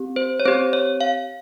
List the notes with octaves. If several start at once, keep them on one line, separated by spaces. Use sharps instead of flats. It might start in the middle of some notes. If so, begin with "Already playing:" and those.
Already playing: C4 G4
C5
C#5
C4 G4 C5
C#5
F5